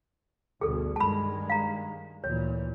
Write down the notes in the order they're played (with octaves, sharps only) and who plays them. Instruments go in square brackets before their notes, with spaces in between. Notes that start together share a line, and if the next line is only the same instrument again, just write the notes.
[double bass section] D2 G2 B2 [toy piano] G#4 A4
[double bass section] G2 D#3 G#3 [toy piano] A5 B5
[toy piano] F5 A#5
[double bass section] D2 A#2 E3 [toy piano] C#5